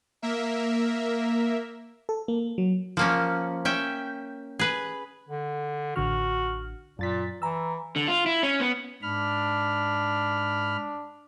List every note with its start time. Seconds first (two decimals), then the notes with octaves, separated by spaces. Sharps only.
0.22 A#3 A#4 E5
2.09 A4
2.28 A#3
2.58 F#3
2.97 F3 A#3 C#4
3.65 C#4 E5 G5
4.59 G#4 B4
5.29 D3
5.96 A1 D3 F#4 F6
6.99 F#2 A#2 A6 B6
7.42 E3 A#5 E6
7.96 D3
8.08 F4
8.26 E4
8.43 C#4
8.60 B3
9.02 G#2 D4 B5 F6